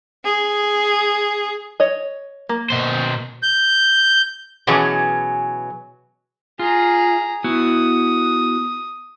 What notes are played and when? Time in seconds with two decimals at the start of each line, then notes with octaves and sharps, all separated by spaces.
0.24 G#4
1.80 C#5 D#5
2.49 A#3
2.70 B2 C5
3.43 G6
4.67 B2 E3 F#3 C#4 G#4
6.59 F4 G#4 A#5
7.44 B3 E4 F#4 D#6